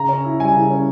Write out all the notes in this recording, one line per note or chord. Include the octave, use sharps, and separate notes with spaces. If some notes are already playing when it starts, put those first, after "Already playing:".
Already playing: C#3 A#5
C#4
E4
G3 G#5
C#3
C#4